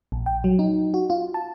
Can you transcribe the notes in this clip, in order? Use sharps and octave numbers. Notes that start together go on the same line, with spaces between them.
A#1
G5
F#3
D#4
F#4
F4
A5